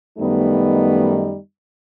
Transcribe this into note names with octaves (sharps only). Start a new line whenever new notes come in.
F#2 D#3 G3 A3 B3 D#4